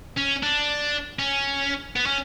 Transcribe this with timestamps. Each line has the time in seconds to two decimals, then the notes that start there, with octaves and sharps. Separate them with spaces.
0.18 C#4
0.43 D4
1.19 C#4
1.96 B3
2.06 C#4